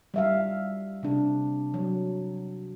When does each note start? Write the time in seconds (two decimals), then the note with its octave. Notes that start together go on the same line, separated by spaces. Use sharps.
0.14 G3 E5 F5
1.03 C3 D4
1.74 F#3